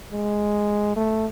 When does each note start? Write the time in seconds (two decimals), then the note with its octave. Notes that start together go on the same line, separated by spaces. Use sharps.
0.11 G#3
0.96 A3